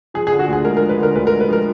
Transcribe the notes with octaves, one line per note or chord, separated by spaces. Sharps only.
F3 G#4
G#4
D3
F#4
D2 G#4
G#3 A#4
A#4
F3
B4
D3 A#4
D2 B4
A#4
G#3
B4
F3 A#4